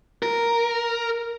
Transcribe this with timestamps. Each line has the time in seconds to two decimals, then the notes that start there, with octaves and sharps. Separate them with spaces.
0.23 A#4